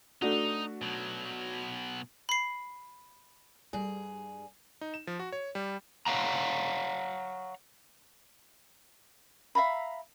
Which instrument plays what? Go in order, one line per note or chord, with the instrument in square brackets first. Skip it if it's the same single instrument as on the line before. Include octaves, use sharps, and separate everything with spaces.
[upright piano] A3 D4 F#4 [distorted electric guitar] D#4
[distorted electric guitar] B2 F#3
[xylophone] B5 C7
[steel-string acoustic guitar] G2 G#4 [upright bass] G3
[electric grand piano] D#4
E7
F3
F#4
C#5
G3
[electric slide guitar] C#5 F5 F#5 A#5
[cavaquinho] E5 F5 A#5 B5